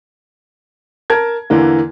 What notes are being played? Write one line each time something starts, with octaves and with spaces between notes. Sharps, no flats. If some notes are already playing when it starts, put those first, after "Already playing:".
A#4 A5 G#6
E2 D3 E3 A#3